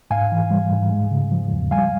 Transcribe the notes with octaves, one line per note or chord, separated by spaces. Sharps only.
G#2 F5 G#5
E3
G3
G#2
G#3
C#3
F3
E2
G3 F5 G#5